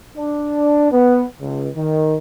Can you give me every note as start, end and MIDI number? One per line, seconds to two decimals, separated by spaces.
0.16 0.88 62
0.92 1.23 59
1.41 1.69 37
1.75 2.17 51